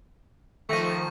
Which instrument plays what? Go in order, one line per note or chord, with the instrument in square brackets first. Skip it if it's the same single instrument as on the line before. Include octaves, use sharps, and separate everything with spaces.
[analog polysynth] D#3 F3 [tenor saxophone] A3 [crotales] C#6 A#6 D#7